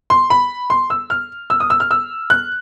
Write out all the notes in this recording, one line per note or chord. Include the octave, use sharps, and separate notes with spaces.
C6
B5
C6
E6
F6
E6
D#6
E6
F6
E6
F#6